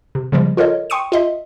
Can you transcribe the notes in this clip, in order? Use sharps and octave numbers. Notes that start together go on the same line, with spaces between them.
C3
C#3 F3 G3 G#3
F4 A4 A#4 C#5 D#5
G5 C6 C#6 D#6 C#7 D#7
F4 D#5 E5